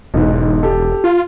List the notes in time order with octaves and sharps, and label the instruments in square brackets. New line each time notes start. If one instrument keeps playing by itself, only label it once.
[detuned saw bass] E1 [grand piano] B1 G#2
[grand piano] G4 A4
[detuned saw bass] F4